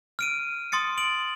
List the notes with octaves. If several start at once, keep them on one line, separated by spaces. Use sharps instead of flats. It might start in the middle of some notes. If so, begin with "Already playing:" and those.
F6 D7 D#7
C6 D#6 A6 C#7
D7 F#7